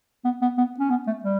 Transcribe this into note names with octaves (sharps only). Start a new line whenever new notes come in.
B3
B3
B3
C#4
B3
A3
G3